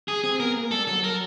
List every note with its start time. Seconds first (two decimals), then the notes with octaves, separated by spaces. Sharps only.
0.08 G#4
0.23 C4 G#4
0.40 B3 A#4
0.56 A#3
0.71 G3 A4
0.87 F#3 A4
1.04 A#4